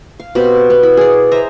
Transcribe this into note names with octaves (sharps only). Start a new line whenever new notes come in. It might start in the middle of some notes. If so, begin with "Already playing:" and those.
F5
B2 C4 G4 B5
B3
E4 B5
G#4 D5
C5 D#5 E5 A#5